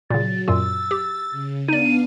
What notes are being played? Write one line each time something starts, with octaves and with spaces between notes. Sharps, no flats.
A#2 C#3 F#3 A6
F#2 A#2 F4 E6 A6
G4
C#3
B3 D4 D#4 D5 F5 D#7